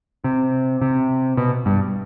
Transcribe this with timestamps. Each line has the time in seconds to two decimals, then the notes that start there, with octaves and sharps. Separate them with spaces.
0.24 C3
0.81 C3
1.37 B2
1.66 G2